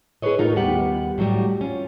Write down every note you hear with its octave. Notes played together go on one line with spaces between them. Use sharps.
E4 G#4 A4 B4 C#5 D#5
A2 D#4 F4 A#4
D#2 G3 B3 G4 B4 F#5
A2 F#3 G3
C#4 F4